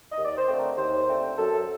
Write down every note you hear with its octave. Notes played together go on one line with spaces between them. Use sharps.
D#5
D#2
D5
C5
D3 A3 C4
A#4
D#2 C5
D3 A3 C4
F#2 A4